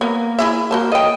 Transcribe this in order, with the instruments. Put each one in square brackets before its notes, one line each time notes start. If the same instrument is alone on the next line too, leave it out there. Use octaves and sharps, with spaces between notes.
[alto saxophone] A#3 [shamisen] B3
[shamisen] E4 G#4 E5
[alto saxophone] A#3 [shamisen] F#4 C5 A5
[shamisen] A4 G5 [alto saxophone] D#5